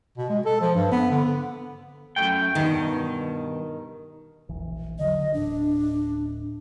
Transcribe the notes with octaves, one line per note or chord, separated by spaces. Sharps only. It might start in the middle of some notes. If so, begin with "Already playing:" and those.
B2
G#3
A4
F3
G2
B3
D3
F#2 A3 G5
G2 B2 D#3
E1 A#1 E3
D3 F3 F#3 D#5
D1 A2 D4